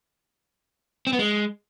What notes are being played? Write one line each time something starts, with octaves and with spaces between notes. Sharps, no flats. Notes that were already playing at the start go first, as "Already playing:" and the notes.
C4
B3
G#3